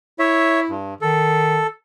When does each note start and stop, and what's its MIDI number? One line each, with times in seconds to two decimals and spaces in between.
0.19 0.74 64
0.19 0.60 73
0.19 0.60 76
0.69 0.94 43
1.01 1.63 51
1.01 1.67 69